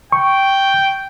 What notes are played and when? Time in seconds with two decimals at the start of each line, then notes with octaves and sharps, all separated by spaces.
0.12 G5 C#6